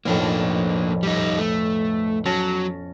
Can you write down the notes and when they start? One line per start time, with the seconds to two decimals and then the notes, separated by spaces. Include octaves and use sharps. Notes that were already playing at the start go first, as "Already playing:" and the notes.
0.05 B1 F2 A2 A#3 D4
1.03 G3 D#4
1.38 A3
2.26 F#3 C#4 A5 A#6